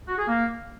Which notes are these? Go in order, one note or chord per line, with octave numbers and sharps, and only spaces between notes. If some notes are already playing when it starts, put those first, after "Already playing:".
F#4
G#4
A#3